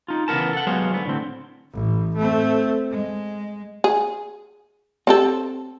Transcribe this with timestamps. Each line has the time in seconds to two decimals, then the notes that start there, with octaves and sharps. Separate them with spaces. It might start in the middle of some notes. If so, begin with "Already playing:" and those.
0.08 D#4 F4
0.28 C#3 E3 F3 B3 A#4 A5
0.53 A4 F#5
0.67 F#3 G#3 B3 C5 C#5 F5
0.93 D3 B3
1.05 A2 D3 C4
1.73 A1
2.17 A3 C4
2.91 G#3
3.84 G#4
5.07 C4 G4 A4